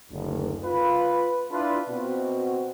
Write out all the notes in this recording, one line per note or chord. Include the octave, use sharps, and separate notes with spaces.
F#1 D2
F4 B4
D4 E4 F4 B4
B2 C4 F#4